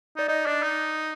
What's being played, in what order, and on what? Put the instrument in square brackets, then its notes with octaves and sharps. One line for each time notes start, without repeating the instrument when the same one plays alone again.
[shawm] D#4 [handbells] D5
[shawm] D#4 [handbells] D#5
[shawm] D4 [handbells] D5
[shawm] D#4